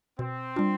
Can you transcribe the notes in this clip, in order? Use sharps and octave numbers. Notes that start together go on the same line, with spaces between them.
B2 C4
G3 D4 F4